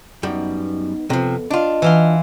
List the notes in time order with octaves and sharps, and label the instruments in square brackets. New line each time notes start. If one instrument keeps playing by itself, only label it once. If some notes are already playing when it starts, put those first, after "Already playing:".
[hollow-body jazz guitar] F#2 G3 [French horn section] B3 D#4
[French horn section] F2 B3 A4 [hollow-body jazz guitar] C3 F3
[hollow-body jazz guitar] D4 F4 [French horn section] D#5
[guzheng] E3 F5 C6